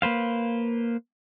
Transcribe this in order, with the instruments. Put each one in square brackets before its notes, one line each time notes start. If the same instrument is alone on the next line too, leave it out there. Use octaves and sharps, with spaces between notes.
[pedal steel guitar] A#3 B4 C5 F5